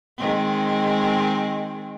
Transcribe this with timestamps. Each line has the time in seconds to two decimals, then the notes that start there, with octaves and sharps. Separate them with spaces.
0.18 D#3 G#3 C4